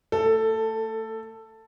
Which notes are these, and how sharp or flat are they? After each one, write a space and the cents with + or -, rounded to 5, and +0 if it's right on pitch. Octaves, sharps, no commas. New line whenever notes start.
A3 +35 A4 +10